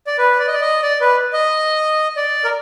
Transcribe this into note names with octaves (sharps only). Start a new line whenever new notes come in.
D5
B4
D5
D#5
D5
D#5
D5
B4
D#5
D5
A#4